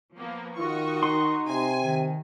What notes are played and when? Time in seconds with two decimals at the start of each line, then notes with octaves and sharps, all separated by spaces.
0.17 F3 A#3 B3
0.58 D#3 F4 F#4 D#5 C#6
1.03 D#4 C6
1.48 C3 G#5
1.83 D#3